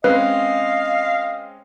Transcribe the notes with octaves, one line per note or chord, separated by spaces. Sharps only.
G#3 C4 C#4 B4 D#5 F5